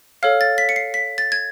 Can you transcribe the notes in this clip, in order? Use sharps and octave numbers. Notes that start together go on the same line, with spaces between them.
A4 C#5 F5 F6
A6
B6
C#7
C7
B6
A6
G#6